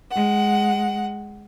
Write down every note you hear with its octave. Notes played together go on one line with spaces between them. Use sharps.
G#3 F#5